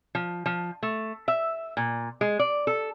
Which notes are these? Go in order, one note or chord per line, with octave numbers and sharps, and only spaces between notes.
F3
F3
A3
E5
A#2
G#3
D5
A4